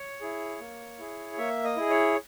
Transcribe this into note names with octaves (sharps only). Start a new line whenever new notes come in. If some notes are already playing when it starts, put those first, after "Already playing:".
Already playing: C#5
E4 G#4
A#3
E4 G#4
A#3 E5
D#5
E4 G#4
C#5